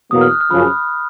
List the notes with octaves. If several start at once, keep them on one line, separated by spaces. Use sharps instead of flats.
E2 B2 F#3 A#3 D#6
F6
F#6
F6
F#2 C#3 F3 B5